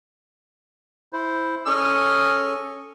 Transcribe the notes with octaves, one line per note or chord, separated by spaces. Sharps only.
E4 C5
C#4 G#4 A4 D#5 C#6 F6